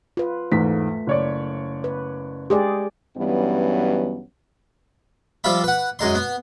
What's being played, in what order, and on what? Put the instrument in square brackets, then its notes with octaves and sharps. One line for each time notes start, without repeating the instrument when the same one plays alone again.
[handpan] F4 B4
[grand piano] E2 G#2 B6 [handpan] A3
[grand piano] F#1 C#5 D5
[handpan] B4
[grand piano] G#3 [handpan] G4 G#4 D5
[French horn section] G2 E3 F#3 G3 B3 C#4
[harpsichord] F3 G3 F4 E5 B5
B4 F#5
F#2 G#3 D#4 C6
B3